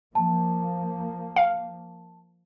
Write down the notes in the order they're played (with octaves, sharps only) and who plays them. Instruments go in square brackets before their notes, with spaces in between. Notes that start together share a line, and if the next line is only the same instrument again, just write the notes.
[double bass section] F3 A#3 [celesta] A5
[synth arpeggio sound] F5